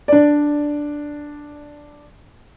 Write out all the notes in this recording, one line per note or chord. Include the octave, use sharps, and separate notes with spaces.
D4 D5